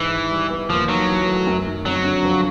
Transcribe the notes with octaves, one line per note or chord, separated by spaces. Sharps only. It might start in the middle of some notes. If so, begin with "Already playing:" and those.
Already playing: G#2 E3
D#3
G3
B3
D#2 F3
D#3 F#3
E3
A3
F#2
D#3
F2 F#3
D3
F3